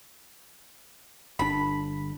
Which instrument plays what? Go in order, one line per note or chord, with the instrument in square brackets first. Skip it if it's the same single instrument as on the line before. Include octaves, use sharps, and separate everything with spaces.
[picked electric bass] G1 D4 [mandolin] B5